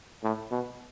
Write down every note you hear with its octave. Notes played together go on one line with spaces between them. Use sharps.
A2
B2